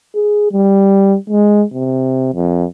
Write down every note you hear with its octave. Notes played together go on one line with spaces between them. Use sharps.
G#4
G3
G#3
C3
F2